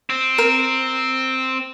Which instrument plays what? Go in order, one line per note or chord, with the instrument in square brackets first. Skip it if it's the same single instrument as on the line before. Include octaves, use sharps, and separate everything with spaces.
[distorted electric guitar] C4
[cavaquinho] A#4